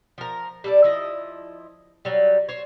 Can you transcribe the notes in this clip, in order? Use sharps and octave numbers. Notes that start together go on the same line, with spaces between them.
F3 A#4
G3 A4 D5
F3 E4 D#5
F#3 G3
C5 C#5